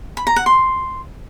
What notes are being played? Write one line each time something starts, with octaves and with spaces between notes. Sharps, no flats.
B5
A#5
F#5
C6